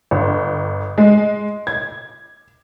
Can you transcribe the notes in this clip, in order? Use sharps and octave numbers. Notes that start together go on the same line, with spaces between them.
G1
G#3
G#6